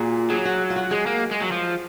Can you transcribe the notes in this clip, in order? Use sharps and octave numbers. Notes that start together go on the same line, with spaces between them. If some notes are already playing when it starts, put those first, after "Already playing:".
Already playing: A#2 F#4 G#4
F#3 G#4
F#4
F4
F#4
G#3 G#4
A#3
G#3
F#3
F3